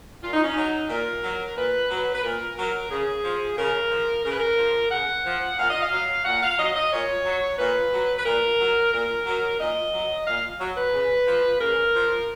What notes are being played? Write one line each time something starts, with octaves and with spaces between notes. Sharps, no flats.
A#2 F4
D#4
C#4
F#3 D#4
A#2 A#4
F#3
A#2 B4
F#3
B4
A#2 A#4
F#3
C#3 G#4
F3
C#3 A#4
F3
C#3 A#4
B4
A#4
F3
C#3 F#5
F3
A#2 F5
D#5
F5
F#3
A#2 F#5
F5
F#3 D#5
D#5
A#2 C#5
F#3
A#2 B4
F#3
B4
A#2 A#4
F#3
A#2 A#4
F#3
A#2 D#5
F#3
A#2 F5
F#3
B4
C#3
F3
C#3 A#4
F3